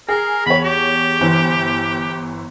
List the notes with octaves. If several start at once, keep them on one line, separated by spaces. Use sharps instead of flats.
G#4 A#4
E2 C#5 B5
G4
G1 E3 C5